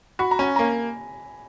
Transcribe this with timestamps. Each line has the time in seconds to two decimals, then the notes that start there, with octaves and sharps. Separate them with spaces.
0.19 F#4 B5
0.31 A#5
0.39 C#4 G#5
0.56 A#3 A#5